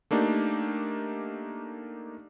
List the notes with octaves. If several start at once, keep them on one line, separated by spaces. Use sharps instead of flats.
A3 A#3 D4 D#4 G4